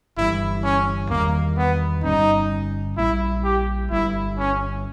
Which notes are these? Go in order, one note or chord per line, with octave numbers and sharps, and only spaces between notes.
G1 G2 E3 G3 E4
C#4
E2 D#3 G3 A#3
B3
G1 G2 G3 C#4 D#4
A#1 A#2 G3 E4
G4
G1 G2 G3 E4
C#4